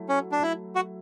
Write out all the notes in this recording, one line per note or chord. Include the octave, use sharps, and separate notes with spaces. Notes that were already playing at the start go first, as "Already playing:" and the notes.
Already playing: F#3 A3 E4
C#4
D4
E4
F#4